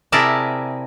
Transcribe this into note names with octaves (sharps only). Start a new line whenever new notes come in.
C3 E4 G#4 A#4 D5 A5